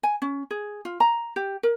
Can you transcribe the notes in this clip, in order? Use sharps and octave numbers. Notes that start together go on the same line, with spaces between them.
G#5
C#4
G#4
F4
A#5
G4
A#4